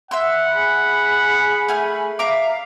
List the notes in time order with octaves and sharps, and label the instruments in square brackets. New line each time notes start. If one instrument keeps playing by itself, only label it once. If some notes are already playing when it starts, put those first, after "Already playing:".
[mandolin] E5 C6 E6 [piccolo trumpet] F#5
[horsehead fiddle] G#4 B5
[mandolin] A3 G#5 F6
[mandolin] E5 A#5 D6 [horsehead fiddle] F5